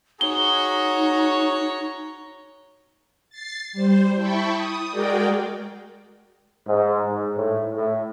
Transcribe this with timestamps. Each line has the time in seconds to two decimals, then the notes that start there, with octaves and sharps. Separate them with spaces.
0.21 D#4 F#4 G#4 C#5 A#5 G7
3.30 A6 C7
3.73 G3 C5
4.15 E4 G5 A5 B5 C#6
4.53 D#6
4.90 G#3 F#4 G#4 A#4 D5 G5
6.67 G#2
7.07 G#2
7.38 A2
7.76 A2